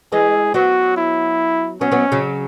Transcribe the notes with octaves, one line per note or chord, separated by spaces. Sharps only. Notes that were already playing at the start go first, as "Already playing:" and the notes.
E3 G#3 G#4
F#3 B3 F#4
E4
F#3 B3 C#4
F#3 B3
C#3 F#3